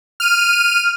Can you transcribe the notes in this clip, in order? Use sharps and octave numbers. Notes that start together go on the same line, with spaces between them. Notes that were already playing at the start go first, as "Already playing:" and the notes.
F6 D#7